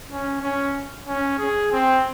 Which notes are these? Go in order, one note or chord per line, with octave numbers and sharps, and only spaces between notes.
C#4
C#4
C#4
G#4
C4